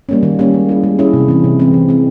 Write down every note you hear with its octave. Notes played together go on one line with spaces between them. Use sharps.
G3 A#3 C#4
D#3
G3 A#3 C#4
G#3
C#4 E4 G#4
G#3
C#4 E4 G#4
C3
E3 G#3 C4
C3
E3 G#3 C4
E3
G#3 C4